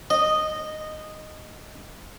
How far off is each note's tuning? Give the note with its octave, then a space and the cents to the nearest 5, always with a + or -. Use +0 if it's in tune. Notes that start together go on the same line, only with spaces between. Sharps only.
D#5 -10